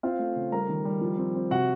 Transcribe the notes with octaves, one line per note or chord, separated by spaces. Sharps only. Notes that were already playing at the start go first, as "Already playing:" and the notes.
C4 F4 F5
A3
C#3
G3 A#4 A#5
D#3
G3
F3
C4
C4
C3 F#4 F#5